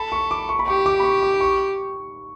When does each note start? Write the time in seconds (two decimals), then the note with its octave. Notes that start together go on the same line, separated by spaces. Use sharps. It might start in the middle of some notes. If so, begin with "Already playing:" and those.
Already playing: A4 B5
0.12 C#6
0.31 D6
0.49 C#6
0.59 B5
0.67 G4 C#6
0.86 D6
1.00 B5
1.04 C#6
1.23 D6
1.41 C#6